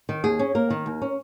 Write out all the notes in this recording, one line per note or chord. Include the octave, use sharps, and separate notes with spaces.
D#3
D#2 G#4
C#4
A#3 A#4
D#3
D#2
C#4